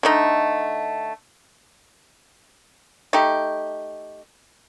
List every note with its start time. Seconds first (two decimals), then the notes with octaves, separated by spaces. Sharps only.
0.03 D3 A3 D#4
3.13 A3 D#4 G4